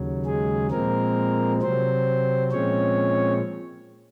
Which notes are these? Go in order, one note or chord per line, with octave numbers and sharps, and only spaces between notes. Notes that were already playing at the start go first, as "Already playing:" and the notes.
Already playing: D#2 C#3 F#3
G#3 G#4
A#2 F3 G#3 A#3 C4 A#4
C3 F#3 C4 C5
A#2 F3 G#3 C4 C#4 C#5